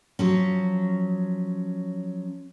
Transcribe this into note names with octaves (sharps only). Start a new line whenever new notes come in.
F3 F#3 C#4